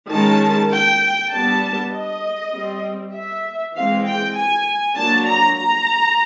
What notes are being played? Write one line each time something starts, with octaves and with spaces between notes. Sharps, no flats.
D#3 G#3 C#4 A5
G5
G3 B3 D4 A5
D#5
G3 C4
E5
E3 G#3 C4 F5
G5
G#5
F#3 A#3 D4 A5
A#5
A#5